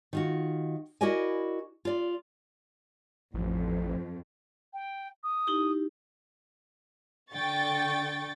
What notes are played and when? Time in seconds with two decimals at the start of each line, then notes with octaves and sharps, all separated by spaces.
0.13 D#3 F4 F#4
1.01 E4 F#4 A#4 D5 D#5 G#5
1.85 F4 D5
3.34 A1 F2
4.73 G5
5.23 D#6
5.47 D#4 E4 G4
7.33 D3 G5 C#6 A6